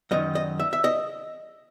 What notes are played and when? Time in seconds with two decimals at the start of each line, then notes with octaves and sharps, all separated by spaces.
0.11 F#2 D#3 D#5
0.35 D#5
0.60 E5
0.73 E5
0.84 D#5